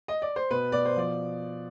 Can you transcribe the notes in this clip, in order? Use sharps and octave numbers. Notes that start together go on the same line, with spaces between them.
D#5
D5
C5
B2 B4
B2 D5
C5
F3 D5